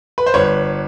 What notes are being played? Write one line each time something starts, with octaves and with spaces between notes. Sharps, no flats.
B4
C5
G1 B4 C#5